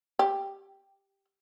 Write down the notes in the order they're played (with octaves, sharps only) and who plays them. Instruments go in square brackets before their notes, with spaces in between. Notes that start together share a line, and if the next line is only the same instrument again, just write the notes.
[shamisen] G4